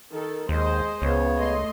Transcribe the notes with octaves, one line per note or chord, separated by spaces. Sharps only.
D#3 A4
D#2 G#3 C5 D#5
C#2 C#3 B3 C#5
A3 D#5 C6